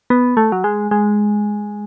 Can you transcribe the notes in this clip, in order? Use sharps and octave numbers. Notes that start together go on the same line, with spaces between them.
B3
A3
F#3
G#3
G#3